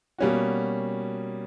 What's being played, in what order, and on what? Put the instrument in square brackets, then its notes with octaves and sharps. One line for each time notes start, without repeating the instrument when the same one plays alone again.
[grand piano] B2 G3 A#3 C#4 F#4